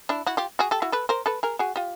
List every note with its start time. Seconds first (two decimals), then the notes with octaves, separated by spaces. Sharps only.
0.09 D4 E4
0.26 E4 F#4
0.37 F4 G4
0.59 F#4 G#4
0.71 G4 A4
0.82 E4 F#4
0.92 A4 B4
1.09 A#4 C5
1.26 A4 B4
1.43 G#4 A#4
1.59 F#4 G#4
1.76 F4 G4